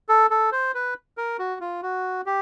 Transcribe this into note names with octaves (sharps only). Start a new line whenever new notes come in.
A4
A4
C5
B4
A#4
F#4
F4
F#4
G4